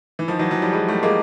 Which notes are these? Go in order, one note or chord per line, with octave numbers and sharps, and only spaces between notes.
E3
D#3 F3
E3 F#3
E3 F#3
F3 G3
F#3 G#3
G3 A3
G#3 A#3